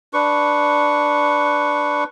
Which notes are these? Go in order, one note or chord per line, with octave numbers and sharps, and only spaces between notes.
D4 B4 C#6